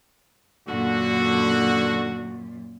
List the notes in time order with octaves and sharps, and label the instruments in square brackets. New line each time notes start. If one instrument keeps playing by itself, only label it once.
[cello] F#2 A#2 [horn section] D3 F#4